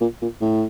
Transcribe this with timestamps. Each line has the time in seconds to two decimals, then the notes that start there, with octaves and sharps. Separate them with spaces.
0.01 A#2
0.22 A#2
0.41 A2